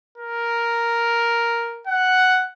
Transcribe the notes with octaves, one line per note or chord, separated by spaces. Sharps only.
A#4
F#5